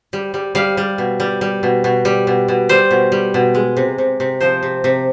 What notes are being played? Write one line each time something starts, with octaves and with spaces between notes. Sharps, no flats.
G3
G3
G3 F5
G3
B2
G3
G3
B2
B2
G3
B2
B2
G3 C5
B2
G3
B2
G#3
C3
C3
C3
F3 C5
C3
C3